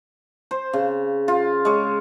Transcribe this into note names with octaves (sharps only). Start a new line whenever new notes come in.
C5
C#3
F4
G#3 C#5